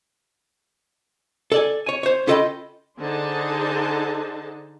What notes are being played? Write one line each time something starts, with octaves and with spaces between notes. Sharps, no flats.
A4 D5 G#5
C#5 G#5
C5 C#5
C#4 F4 A4 D#5 G5 B5
D3 D4 D#4 G#4 C5 A5